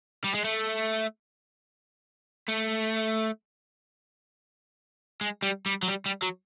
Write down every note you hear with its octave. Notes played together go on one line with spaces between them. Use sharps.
G3
G#3
A3
A3
G#3
G3
G3
F#3
G3
G3
F#3